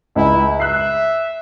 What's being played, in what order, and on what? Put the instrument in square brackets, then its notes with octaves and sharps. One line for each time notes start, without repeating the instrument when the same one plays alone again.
[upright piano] C#2 [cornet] E4
[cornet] E5 [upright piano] F#6 C7